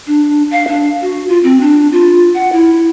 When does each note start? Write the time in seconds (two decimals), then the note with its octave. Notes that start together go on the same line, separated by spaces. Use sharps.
0.07 D4
0.51 F5
0.68 D4
1.02 F#4
1.28 F4
1.44 C4
1.61 D4
1.92 F4
2.34 F#5
2.53 E4